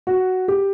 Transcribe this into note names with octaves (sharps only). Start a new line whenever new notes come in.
F#4
G4